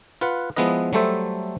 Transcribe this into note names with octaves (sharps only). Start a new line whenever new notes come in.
F4 B4 F#5
F3 G#3 B3 E4 B4 D#5
F#3 G3 A3 A4 C5 E5